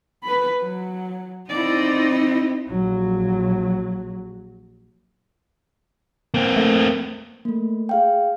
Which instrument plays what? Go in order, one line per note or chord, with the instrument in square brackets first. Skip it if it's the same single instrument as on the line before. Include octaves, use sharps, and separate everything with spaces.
[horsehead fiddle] B4 B5
F#3
[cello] C4 D#4 [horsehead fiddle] E4 D5
[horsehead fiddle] E4
[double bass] A#1 F#3
[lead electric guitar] A#3 C4
[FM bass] A3
[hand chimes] A3 A#3
G#4 F5 G5